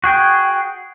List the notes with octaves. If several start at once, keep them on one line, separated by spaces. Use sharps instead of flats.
F#4 G#4 G5